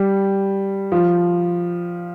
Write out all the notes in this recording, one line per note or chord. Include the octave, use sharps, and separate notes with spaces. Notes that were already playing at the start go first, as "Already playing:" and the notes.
Already playing: G3
F3